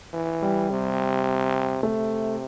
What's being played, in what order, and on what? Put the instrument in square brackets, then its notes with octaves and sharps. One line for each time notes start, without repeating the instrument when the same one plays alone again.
[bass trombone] E3
[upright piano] G3
[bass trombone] C3
[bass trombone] C3 [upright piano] A3